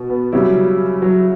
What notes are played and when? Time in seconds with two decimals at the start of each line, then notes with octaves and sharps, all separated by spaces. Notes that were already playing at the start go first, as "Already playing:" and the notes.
Already playing: B2
0.10 B3
0.32 C#3 F#3 G3 C#4 E4
1.02 F#3